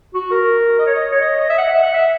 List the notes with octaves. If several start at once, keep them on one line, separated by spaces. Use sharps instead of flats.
F#4
A#4
D#5
C#5
D#5
C#5
D#5
D#5
E5
F#5
E5
F#5
E5